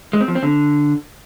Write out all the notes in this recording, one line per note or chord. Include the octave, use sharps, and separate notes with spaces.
G#3
C4
F3
C4
D3